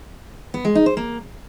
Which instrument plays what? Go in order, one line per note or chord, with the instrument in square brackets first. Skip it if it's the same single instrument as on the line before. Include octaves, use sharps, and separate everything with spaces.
[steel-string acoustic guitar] B3
G#3
D#4
C5
A#3